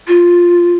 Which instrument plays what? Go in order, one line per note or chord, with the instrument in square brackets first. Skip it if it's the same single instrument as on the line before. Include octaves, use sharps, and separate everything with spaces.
[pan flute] F4